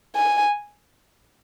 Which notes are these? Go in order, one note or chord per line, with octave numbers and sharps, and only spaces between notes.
G#5